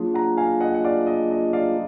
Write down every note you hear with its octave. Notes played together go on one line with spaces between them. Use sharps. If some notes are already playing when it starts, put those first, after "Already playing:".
Already playing: F#3 A#3 D4 F4 G#4
F#5 A#5
F5 G#5
D#5 F#5
F#5
D5 F5
D#5
D#5
D5 F5